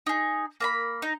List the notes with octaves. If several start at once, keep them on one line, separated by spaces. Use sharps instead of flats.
D#4 G#4
A#3 A#5 B5
D#4